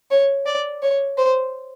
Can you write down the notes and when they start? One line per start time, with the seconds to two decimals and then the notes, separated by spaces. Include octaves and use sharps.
0.11 C#5
0.46 D5
0.82 C#5
1.18 C5